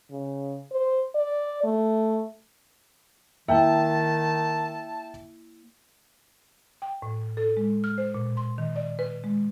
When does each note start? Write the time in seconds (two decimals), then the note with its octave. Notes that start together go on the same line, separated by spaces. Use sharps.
0.11 C#3
0.72 C5
1.15 D5
1.64 A3
3.49 D#3 A#3 E4 E5 G5 A5
6.82 G5
7.02 A2
7.37 A4
7.57 G#3
7.84 F6
7.98 C5
8.14 A#2
8.37 C6
8.58 D#3
8.76 D5
8.99 B4
9.24 G#3